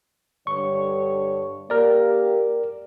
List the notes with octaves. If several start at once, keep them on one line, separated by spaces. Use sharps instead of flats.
G2 D3 C#5 C#6
A#3 G4 A#4 D5